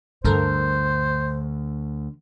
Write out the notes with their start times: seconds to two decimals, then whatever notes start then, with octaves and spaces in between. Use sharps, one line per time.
0.25 D2 G2 D3 A4 A#4 C5